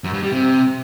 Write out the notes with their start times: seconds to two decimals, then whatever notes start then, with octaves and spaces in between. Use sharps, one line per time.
0.04 F#2
0.13 G2
0.23 G3
0.32 C3